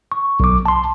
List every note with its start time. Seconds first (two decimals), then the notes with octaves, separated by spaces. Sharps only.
0.12 C#6
0.40 B1 D6
0.66 A5 C6